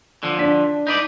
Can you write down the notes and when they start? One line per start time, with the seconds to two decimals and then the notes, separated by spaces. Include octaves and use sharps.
0.23 D3 F3
0.38 D4 B6
0.87 D#4 B4 D5